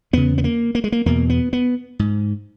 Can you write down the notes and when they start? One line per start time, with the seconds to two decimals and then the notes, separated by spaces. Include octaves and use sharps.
0.13 E2 C#3 B3
0.38 B3
0.44 A#3
0.75 A#3
0.84 G#3
0.92 A#3
1.06 E2 B2 A#3
1.30 B3
1.53 B3
1.99 G#2